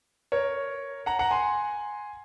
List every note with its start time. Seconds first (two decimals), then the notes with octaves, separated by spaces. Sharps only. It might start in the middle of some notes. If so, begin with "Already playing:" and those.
0.32 A#4 C#5
1.06 F#5 A#5
1.19 F#5 A#5
1.31 G#5 C6